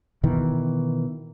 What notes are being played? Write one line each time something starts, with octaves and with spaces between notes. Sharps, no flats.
B2 D#3 E3